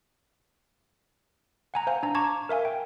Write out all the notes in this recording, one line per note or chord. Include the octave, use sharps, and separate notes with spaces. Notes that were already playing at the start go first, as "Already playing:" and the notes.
F#5 G#5 A#5
C5 F5 G#5
D4 A#5
A5 A#5 C#6 D6 G#6
A#4 E5 F5 G#5
G5